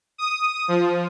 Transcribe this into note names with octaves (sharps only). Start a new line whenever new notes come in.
D#6
F3